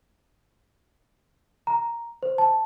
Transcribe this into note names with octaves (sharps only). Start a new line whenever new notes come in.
A#5
C5
A5